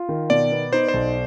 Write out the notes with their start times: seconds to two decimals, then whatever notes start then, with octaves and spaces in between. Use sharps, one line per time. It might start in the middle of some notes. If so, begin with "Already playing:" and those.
Already playing: F4
0.09 D#3
0.30 B2 D5
0.52 B3
0.73 D#4 C5
0.88 C5
0.94 B1